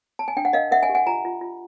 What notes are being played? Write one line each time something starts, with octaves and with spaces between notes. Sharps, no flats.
A5
G#5
D4 G5
F#5
A#4 D#5 F5
A#4 E5 F#5
F#5 G#5
G4
F#5 G#5
F4 G#5 A#5
F4
F4